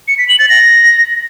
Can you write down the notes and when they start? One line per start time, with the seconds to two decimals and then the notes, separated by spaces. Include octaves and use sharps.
0.08 C#7
0.18 B6
0.29 F#7
0.39 A6
0.49 A#6